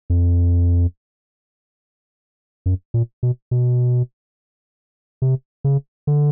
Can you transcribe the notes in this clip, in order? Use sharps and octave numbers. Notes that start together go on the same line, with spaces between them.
F2
F#2
A#2
B2
B2
C3
C#3
D3